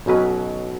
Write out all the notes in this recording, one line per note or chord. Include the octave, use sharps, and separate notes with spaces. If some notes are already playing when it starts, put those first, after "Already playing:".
B1 B2 F#3 C#4 B4